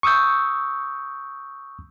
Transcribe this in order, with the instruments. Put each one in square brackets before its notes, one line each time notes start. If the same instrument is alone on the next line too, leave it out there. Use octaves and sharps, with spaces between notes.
[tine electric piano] C#6 D#6 E6 G6